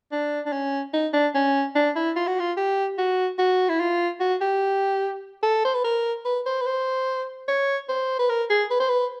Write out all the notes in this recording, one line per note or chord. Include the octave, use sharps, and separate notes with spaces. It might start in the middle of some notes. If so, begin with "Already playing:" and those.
D4
D4
C#4
D#4
D4
C#4
D4
E4
F4
F#4
F4
G4
F#4
F#4
E4
F4
F#4
G4
A4
C5
B4
A#4
B4
C5
B4
C5
C#5
C5
B4
A#4
G#4
B4
C5
B4